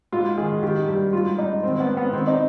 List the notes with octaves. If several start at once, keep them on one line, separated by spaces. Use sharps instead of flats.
G#2 F4
D#3 G#4
D#3 G4
G2 G4
G#2 F4
G#2 D#4
D#3 C4
B3
G#2
B3
D#3 C4
D#4